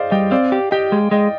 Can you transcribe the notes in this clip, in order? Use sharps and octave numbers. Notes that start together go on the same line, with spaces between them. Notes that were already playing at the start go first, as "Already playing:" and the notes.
Already playing: G#4 C5 D5 D#5 F5
G3 D#5 G5
C4 D5 F5
G4
G4 D#5 G5
G#3
G#3 D#5 G5